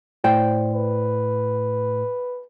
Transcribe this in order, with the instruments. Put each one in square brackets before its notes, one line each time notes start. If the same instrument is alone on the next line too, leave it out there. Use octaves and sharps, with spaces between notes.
[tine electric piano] A2 [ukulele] C5 D5 G5
[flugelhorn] B4